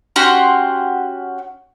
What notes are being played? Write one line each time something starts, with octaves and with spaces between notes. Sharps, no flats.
C#4 F#4 G4 C6